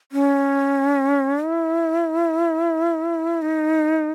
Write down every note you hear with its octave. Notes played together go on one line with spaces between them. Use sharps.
C#4
E4
D#4